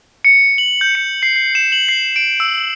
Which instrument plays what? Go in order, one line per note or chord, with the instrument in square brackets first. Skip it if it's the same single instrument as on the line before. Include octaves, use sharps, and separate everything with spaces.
[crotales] C#7
F#7
G6
C#7
C7
C7
E7
F#7
C7
D7
E6